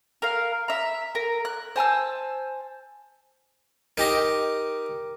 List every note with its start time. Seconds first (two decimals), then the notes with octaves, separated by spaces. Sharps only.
0.22 A#4 F5
0.68 E5 A#5
1.15 A#4
1.45 F#6
1.76 C5 G#5 A5 E6
3.98 D#4 G4 A#4 D#5 D6